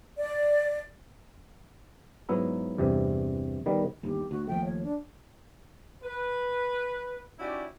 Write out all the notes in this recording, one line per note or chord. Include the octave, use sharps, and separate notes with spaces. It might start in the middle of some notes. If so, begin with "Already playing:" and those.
D5
G#2 F#3 B3 E4 E5 A#5
E2 G2 C3
D#3 G3 B3
G1 D#2 G4
D2 F#4
D#2 F3 A3 G5
C#5
D4
B4
C#4 D#4 E4 F#4 G4 D5